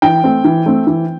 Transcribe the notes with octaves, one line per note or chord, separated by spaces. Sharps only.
E3 G5
A3 C4
E3
A3 C4
E3